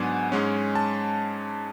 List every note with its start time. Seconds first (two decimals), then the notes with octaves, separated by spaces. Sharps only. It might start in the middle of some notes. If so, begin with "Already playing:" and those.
Already playing: G#2 F#3 B3 D4 F#5 G#5
0.32 G#2 G#3 C#4
0.75 A5